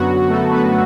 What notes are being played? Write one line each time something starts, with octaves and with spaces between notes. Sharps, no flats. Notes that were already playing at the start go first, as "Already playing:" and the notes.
Already playing: F#2 D3 F#3 B3 F#4
A3 A4
B3 B4